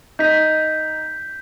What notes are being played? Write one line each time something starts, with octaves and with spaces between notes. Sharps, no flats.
D#4 G6 B6